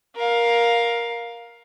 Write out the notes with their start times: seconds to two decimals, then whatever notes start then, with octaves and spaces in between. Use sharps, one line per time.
0.16 A#4 F5